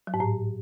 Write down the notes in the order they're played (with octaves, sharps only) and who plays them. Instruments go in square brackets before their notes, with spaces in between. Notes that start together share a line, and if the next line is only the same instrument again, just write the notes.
[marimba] F#3
G#2
A2